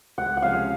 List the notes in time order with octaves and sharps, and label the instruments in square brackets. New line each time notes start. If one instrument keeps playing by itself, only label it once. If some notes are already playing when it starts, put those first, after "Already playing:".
[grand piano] C#2 [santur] F#5
[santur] F#5
[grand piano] C3 F3 G#3 C#4 [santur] F5